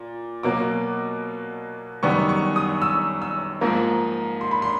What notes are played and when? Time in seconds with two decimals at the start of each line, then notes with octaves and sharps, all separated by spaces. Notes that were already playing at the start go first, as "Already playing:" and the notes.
Already playing: A#2
0.43 B2 F#3 A#3 D6
2.03 F#2 D#3 G3 B3 C#6
2.29 C#6
2.56 D#6
2.82 E6
3.22 E6
3.61 G#2 F3 A#3
4.41 C6
4.51 B5
4.62 C6